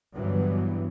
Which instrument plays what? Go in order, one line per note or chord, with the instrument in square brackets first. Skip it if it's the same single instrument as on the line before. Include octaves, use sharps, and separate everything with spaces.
[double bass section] G2 D3 E3 F#3 B3